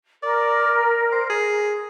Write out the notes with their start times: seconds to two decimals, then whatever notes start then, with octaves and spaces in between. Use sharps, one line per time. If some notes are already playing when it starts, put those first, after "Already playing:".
0.23 A#4 D5
1.12 C5
1.30 G#4